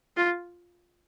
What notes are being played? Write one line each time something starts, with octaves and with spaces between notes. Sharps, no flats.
F4